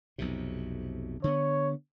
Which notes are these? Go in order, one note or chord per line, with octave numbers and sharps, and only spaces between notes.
B1 F2 C3
D3 B3 C#5